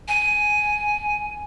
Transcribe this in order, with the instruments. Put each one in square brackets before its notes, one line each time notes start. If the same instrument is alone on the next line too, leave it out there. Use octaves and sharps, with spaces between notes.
[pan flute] G#5